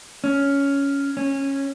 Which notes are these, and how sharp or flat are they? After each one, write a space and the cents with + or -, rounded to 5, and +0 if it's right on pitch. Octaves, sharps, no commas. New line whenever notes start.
C#4 +10
C#4 -15